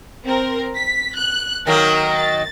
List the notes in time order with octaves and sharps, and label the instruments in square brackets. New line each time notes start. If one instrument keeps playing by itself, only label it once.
[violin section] C4 A#4
B6
F#6
[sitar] D#3 F#3 A#3 [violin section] A#4
[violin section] A6